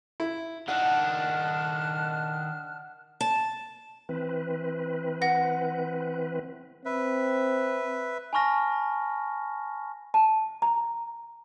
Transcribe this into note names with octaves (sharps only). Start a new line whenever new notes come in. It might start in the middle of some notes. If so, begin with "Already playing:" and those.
E4
D#3 D4 F#5 A5 F6 F#6
A5
E3 C4 B4
F#5 A#6
C4 B4 E5
G#5 A5 B5 C#6 F6 A#6
A5
A#5